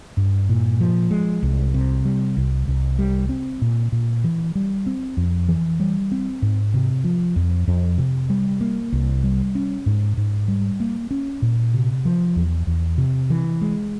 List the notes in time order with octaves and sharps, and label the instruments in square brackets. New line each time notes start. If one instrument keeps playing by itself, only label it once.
[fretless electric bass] G2
A#2
F3
G#3
C2
C3
G3
C2
C2
G3
C4
A#2
A#2
E3
G3
C4
F2
E3
G3
C4
G#2
C3
F3
F2
F2
C3
G3
A#3
C2
G3
C#4
G#2
G#2
G3
A#3
C#4
A#2
C3
F3
E2
E2
C3
E3
G#3